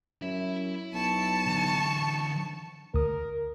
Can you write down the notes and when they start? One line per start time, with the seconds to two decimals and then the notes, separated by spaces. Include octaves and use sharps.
0.22 F#2 E4 E5
0.94 B1 A5 C#6
1.46 D3 E3
2.94 D2 A#4 D#6